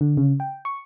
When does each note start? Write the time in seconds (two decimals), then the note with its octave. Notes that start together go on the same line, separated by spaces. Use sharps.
0.01 D3
0.17 C#3
0.40 G5
0.65 C#6